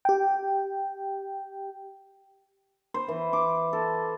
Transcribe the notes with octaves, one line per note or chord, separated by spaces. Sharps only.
G4 G5
C5
E3
D6
A4